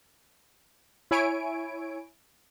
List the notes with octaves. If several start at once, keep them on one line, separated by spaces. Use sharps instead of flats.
E4 C#5 G#5 D7